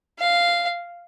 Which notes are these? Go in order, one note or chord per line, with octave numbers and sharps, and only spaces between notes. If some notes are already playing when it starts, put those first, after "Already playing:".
F5